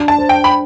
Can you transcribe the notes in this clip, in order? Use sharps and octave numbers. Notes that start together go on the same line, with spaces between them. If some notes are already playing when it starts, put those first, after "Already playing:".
Already playing: D4
A5
C5
G5
B5